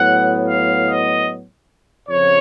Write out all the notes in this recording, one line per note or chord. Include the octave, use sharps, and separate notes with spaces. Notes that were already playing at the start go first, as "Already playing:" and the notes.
Already playing: A2 F#3 B3 F#5
F5
D#5
F2 C#3 F3 C#5